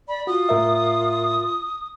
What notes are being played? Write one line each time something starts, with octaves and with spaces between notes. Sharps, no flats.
D5 B5
F4 F#4 D#6
A2 A#4 E5